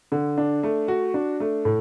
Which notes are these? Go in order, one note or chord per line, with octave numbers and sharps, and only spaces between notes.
D3
D4
A3
F#4
D4
A3
A2